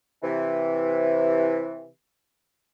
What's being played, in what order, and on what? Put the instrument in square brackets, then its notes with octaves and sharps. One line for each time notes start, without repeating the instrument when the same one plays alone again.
[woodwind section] C3 E3